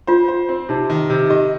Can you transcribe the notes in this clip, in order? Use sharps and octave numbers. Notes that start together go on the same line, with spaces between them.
F4 C5
C5
C4
C3 D#4
D#3
C3
G4 D#5